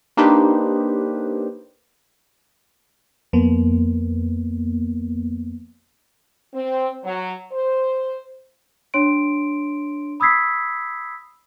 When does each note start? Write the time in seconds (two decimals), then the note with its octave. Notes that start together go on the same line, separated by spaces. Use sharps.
0.17 A#3 D4 D#4 G4 B4 C5
3.33 F2 A#3 B3
6.55 C4
7.04 F#3
7.52 C5
8.94 D4 C#5 C6 D7
10.20 B5 D#6 E6 G#6 B6 C7